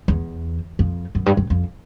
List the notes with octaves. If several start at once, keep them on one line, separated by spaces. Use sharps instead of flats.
E2
F2
F#2
G2
F#2
F2